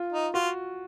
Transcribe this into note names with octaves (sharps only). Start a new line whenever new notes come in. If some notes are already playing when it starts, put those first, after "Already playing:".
Already playing: F4
D#4
F4 F#4